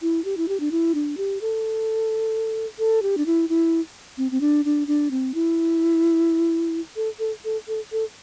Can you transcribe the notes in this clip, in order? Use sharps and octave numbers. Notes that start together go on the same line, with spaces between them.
E4
G4
E4
G4
D4
E4
D4
G4
A4
A4
G4
D4
E4
E4
C4
C4
D4
D4
D4
C4
E4
A4
A4
A4
A4
A4